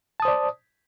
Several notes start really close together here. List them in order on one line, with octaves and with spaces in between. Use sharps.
A5 D#6 C5 D5